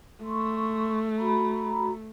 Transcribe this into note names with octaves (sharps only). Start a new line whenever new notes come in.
A3 C6 C#6
F#4 A#5 B5